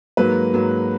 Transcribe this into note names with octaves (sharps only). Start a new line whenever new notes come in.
G#2 F#3 A#3 B4
G#2 F#3 A#3